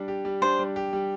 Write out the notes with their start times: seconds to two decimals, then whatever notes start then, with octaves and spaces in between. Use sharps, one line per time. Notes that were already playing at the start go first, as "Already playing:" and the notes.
Already playing: G3 D4
0.08 G4
0.25 G3
0.42 D4 C5
0.59 G3
0.76 G4
0.93 G3